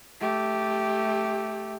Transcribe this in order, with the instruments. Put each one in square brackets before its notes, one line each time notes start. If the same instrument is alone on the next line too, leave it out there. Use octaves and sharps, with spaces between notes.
[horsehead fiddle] A3 G4